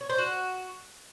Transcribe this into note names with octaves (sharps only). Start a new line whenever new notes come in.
C#5
C5
F#4